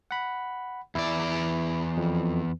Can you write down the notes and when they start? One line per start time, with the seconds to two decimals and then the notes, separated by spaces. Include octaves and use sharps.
0.11 F#5 B5
0.95 E2 E4 D5
1.97 F2